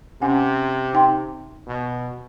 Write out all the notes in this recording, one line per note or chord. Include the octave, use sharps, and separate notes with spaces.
C3 C#4 F#5 G#5
D#4 G5 C6
B2